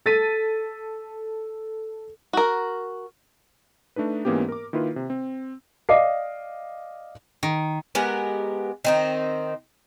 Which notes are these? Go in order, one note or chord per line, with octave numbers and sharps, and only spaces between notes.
A4 A6 B6 D#7
F#4 A#4
A3 D4 D#4 B4
G#2 E3 A#3 B3 C#4 G4
A#4 D6
D#3 A#3 E4 F4 B4
C3
C4
D5 D#5 F5 D6 C7
D#3
G#3 B3 G4 A#4
D#3 C4 D#4